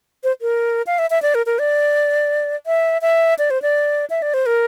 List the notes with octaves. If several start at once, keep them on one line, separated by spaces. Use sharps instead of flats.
C5
A#4
F5
E5
E5
D5
A#4
A#4
D5
E5
E5
D5
C5
D5
E5
D5
C5
A#4